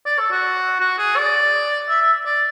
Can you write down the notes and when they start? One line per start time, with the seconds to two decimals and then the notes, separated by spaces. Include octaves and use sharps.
0.06 D5
0.19 A4
0.31 F#4
0.80 F#4
0.98 G#4
1.17 D5
1.89 E5
2.01 E5
2.26 D5